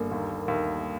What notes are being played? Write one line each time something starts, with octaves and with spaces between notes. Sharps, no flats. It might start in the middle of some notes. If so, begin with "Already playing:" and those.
Already playing: G1 A#3
D#2
D#2